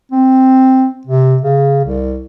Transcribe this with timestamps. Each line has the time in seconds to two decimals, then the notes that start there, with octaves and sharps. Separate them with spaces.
0.12 C4
1.07 C3
1.42 C#3
1.84 C2